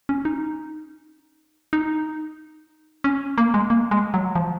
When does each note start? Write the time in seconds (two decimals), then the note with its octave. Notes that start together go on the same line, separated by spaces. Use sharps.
0.09 C#4
0.25 D#4
1.73 D#4
3.04 C#4
3.38 A#3
3.54 G#3
3.70 A#3
3.91 G#3
4.14 F#3
4.35 F3